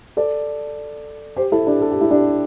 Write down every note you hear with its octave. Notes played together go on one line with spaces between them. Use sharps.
A4 D5
G4 C5
E4 A4
D4 G4
A4
G4
E4
D4 G4